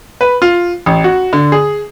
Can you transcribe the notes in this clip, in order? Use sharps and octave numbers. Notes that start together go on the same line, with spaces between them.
B4
F4
A1
F#4
D3
G#4